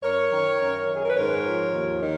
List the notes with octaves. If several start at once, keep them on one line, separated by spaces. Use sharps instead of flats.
F#2 A#4 C#5
D#3
F#2
D#3
G#4
A#4
B4
G#2 A#4 C#5
F3
D#2
D#3